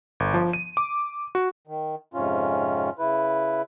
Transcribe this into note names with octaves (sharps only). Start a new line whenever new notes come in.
G1
F3
D#7
D6
F#4
D#3
F2 G#2 C3 C#4 F4
C#3 E4 B4